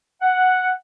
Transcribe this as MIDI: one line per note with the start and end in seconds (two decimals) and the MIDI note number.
0.22 0.72 78